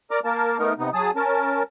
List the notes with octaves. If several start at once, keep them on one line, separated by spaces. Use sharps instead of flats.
A#4 D5 A#5 D6
A#3 A#4 A5
A3 B3 D#4 A#4
C3 B3 D#4
F#3 G#4 A5 D#6
C#4 A#4 A5